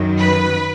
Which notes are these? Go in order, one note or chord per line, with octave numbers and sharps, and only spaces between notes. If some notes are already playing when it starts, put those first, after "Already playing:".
Already playing: F#2 D#3 F#3
B4